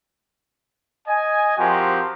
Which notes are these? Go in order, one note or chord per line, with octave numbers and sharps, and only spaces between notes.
D#5 G#5
F3 C4 F#4 G4 A#4